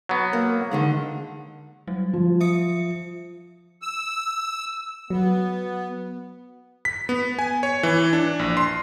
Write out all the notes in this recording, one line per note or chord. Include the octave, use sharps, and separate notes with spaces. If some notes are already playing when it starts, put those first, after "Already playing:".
F#3 B3
A#3
D3 D#3 G#3
F#3 G3
F3
E5 D#6 C#7
E6
F#3 B3
B6
B3
G#5
C#5
E3
D4
A#1
C6